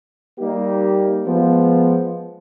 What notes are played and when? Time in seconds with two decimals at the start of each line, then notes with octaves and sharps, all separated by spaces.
0.39 G3 A#3 D#4 G4
1.26 F3 G#3 B3